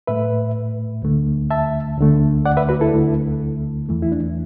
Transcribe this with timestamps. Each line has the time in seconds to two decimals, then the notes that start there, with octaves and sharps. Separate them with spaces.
0.07 A2 A3 B4 E5
1.02 D2 D3 A3
1.51 E5 A5
1.97 D2 D3 A3
2.46 D5 F#5
2.57 B4 E5
2.69 F#4 B4
2.81 E4 A4
2.93 D2 D3 A3
3.89 E2 E3 A3
4.03 E4
4.12 D4